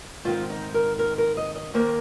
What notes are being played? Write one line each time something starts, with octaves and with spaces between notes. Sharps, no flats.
G#2 D#3 C4 F4
D#4
A#4
A#4
A#4
D#5
D#5
D#2 D#3 A#3 C5